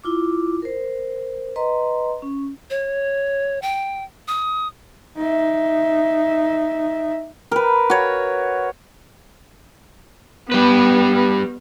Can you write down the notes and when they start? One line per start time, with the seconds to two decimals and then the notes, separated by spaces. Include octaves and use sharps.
0.04 E4 F4 D6
0.62 A#4 C5
1.56 B4 D#5 A#5 C6
2.22 C#4
2.70 C#5
3.62 G5
4.28 D#6
5.17 D#4 E5
7.51 A#4 B4
7.90 F#4 C#5
10.52 G3 B3 B4